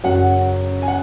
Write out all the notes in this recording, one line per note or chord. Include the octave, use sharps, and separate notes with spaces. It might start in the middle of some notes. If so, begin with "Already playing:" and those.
F#2 C#3 F#3 F#5
G#5
F#5